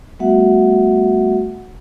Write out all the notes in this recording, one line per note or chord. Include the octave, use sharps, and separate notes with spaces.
G3 A3 B3 F#4 E5 F#5